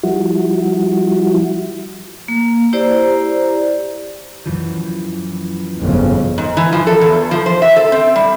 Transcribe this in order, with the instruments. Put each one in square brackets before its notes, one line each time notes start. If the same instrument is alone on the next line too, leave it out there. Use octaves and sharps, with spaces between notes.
[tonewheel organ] F3 G3 E4 F#4
[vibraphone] A#3
E4 G4 C5 D5 A#5
[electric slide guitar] F#2 E3 F3
[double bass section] G1 F2 C#3
[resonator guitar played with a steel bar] G#2
E3
F3
A4
E2
F3
C5
E5
A4
C4
G3